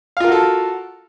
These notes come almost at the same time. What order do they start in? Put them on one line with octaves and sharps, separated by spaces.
F5 F4 A#4 F#4 A4